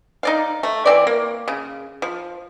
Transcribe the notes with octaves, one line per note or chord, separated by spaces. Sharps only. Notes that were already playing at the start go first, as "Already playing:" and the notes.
D#4 D5 F5
A3
E3 C4 D5
A#3
C#3
F3